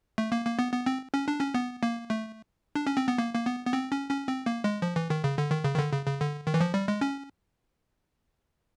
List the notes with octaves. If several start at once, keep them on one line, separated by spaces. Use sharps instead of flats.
A3
A#3
A#3
B3
B3
C4
C#4
D4
C#4
B3
A#3
A3
D4
C#4
C4
B3
A#3
A#3
B3
B3
C4
C#4
C#4
C4
A#3
G#3
F3
E3
D#3
C#3
D3
D#3
C#3
D#3
D3
C#3
C#3
D3
D#3
E3
F3
G3
G#3
C#4